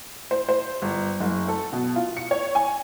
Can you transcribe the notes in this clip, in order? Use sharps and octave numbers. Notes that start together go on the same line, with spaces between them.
C5
C5
G1
F#1
A4
B2
F4
C#7
C#5
G#5